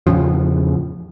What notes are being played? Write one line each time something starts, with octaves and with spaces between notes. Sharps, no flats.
E2 A2 C#3 F3